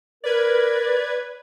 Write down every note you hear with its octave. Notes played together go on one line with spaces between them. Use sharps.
A#4 B4 D5 G#6